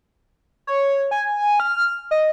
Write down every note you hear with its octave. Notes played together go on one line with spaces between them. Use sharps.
C#5
G#5
F6
D#5